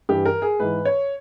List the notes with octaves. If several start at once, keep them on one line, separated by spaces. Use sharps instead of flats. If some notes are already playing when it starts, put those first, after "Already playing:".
G2 E3 G4
A#4
G#4
G#2 E3 B4
C#5